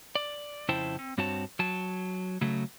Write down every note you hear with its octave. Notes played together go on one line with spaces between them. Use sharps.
D5
F2 C#3 E4 C5 G5 A5
C4
G2 C4 F#4 C#5 A5
F#3 A5
C#3 F#3 A3